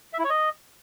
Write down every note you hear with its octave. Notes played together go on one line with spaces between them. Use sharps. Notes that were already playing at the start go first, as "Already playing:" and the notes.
E5
E4
C#5
D#5